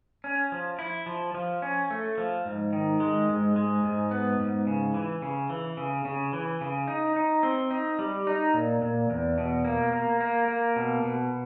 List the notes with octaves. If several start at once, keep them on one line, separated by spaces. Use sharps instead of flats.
C#4
F3
E4
F3
F3
C#4
A3
F3
G#2
D#3
G#3
G#2
G#3
G#2
B3
G#2
C#3
E3
C#3
E3
C#3
C#3
E3
C#3
D#4
D#4
C4
D#4
G3
D#4
A#2
A#2
E2
B2
A#3
A#3
A#3
A#3
B2
B2